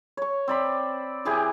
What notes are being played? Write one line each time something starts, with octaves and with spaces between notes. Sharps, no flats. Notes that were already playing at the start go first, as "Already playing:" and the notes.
C#5 C#6
C4 D5 B5
E3 G4 G#4 D5